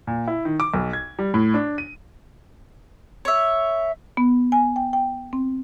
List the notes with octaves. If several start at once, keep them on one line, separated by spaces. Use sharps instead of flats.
A#2
E4
D#3
D6
B1
G#6
G3
A2
D4
D#7
C#5 E5
B3
G#5
G5
G5
C4